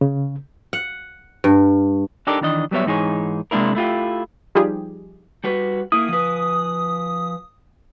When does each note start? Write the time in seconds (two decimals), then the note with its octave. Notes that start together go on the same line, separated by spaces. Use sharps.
0.01 C#3
0.73 F#5
1.44 G2
2.27 D4 D#4 G4 A4 A#4 D5
2.41 D#3 E3 D4 D#5
2.71 F#3 G3 B3 C#5 E5
2.86 G#2 E3 D#4 F#4 G#4 C#5
3.51 C3 G#3 A#3 D4 E4 A#4
3.75 A3 E4 F4 G4
4.55 F3 G3 D#4 F4 G4 G#4
5.44 G3 F#4 B4
5.92 A#3 E4 D#6
6.09 F3 B4